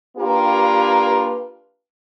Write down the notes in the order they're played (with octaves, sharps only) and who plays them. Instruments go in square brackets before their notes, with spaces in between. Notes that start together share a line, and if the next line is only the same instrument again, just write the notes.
[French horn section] A#3 D4 F4 G4 B4